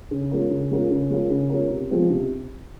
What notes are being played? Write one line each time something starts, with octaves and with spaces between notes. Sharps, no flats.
C#3
G#3 C#4 F4 A#4
C#3
G#3 C#4 F4 A#4
C#3
G#3 C#4 F4 A#4
C#3
G#3 C#4 F4 A#4
C3
F3 G#3 C4 F4
C3